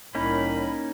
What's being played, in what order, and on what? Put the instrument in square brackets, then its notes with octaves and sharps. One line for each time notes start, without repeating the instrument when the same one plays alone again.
[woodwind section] C2 A2 B5 [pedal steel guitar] A#3 C#4 D#4